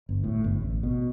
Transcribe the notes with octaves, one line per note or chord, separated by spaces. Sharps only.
G1
A2
G1
A1
B2